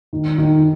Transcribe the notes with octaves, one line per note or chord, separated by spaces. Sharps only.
D#3
D#3